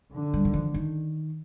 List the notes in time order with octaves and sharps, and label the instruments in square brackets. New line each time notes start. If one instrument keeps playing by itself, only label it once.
[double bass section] D3
[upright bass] G3
D#3
F3
D#3